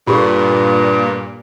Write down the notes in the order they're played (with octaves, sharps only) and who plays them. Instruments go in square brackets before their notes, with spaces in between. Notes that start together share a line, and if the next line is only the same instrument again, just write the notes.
[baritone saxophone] G2 [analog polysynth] A#2 [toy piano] F4 G4 A4